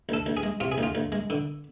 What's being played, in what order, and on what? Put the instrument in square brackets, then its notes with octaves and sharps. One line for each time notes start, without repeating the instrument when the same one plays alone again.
[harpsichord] D2 A4
D2
G#4
G#3
C3 F4
G#4
D2 F4
D2
G#3
D3